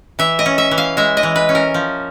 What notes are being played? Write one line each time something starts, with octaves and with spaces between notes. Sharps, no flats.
E3 E5
D#5
C#4
E5
E3
F5
G#3 E5
D#5
E3
B4
C#4
A#4
F3